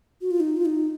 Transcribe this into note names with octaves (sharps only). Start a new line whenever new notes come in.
F#4
F4
D#4
F4
D#4